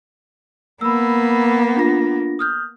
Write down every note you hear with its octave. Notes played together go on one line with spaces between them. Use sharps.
A#3 B3 B5 E6
D4 F4 A#6
D#6 F6 G6